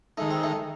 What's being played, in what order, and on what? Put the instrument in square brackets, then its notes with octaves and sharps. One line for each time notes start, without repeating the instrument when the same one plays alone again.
[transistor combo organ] D#3 G#3 D#4 [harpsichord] A3
[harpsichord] C4
A3